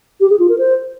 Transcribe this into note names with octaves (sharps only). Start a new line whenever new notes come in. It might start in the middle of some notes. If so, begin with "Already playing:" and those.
G4
G#4
F4
A#4
C5